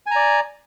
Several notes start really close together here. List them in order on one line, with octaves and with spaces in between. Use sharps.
G#5 A#5 D5